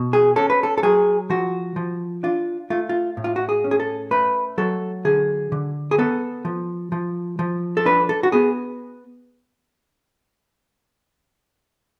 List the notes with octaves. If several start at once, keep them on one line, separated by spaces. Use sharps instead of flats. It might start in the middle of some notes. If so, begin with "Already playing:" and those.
Already playing: B2
G#4
C#4 A4
B4
A4
A4
F#3 G#4
F3 F#4
F3
D4 F4
A3 F4
F4
A2
F4
F#4
G#4
C#4
G#4
A4
A3 B4
F#3 A4
D3 G#4
D3
G#4
B3 A4
F3
F3
F3
A4
D4 B4
A4
F#4
B3 G#4